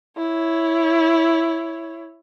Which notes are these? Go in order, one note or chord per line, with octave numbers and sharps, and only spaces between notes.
E4 C#5